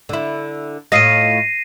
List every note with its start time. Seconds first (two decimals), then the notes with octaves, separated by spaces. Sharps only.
0.09 D3 E4
0.92 A2 F4 D#5 A#6 C7 D#7